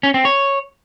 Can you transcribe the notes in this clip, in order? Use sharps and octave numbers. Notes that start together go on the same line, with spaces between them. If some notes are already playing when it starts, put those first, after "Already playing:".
C#4
C4
C#5